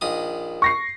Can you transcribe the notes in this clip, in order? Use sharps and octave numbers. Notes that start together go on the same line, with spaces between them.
A#1 D#3 D#6
C#6 A#6 C7